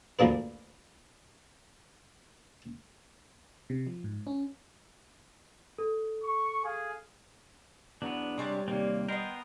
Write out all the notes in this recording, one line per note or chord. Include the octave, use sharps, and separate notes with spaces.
D2 F3 A#3 D4 B4
C3
F3
G#2
C#4
A4
C#6
G#4 F5
E2 F#3 B3 D4
C3 G3 G#3 C4 A#4 C#5 D5
D#2 C3 A#3 C4
D#3 B3 D#4 A#4 G5 C6